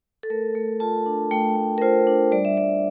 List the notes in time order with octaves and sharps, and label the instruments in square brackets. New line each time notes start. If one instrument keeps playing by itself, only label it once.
[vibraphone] A4
A3 A#4
A3
F4 A5
D4
A3 G5
A3
A#4
F4 C5
D4
G3 D5
E5
G3 D5